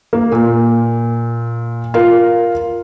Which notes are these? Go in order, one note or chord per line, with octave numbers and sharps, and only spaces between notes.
A#3
A#2
F4 A#4